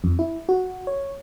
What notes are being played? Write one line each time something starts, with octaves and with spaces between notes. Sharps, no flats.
F2
E4
F#4
C#5